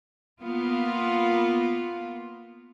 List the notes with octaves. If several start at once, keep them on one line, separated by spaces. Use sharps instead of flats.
A#3 B3 F4